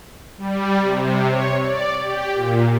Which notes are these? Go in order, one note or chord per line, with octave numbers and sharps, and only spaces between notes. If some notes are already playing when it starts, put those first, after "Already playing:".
G3
C3
C#5
D5
G4
A#2